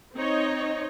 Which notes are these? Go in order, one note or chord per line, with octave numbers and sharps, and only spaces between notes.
C4 D#4 C#5 D#5